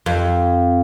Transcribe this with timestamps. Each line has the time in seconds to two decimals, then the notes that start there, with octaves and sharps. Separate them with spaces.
0.06 F2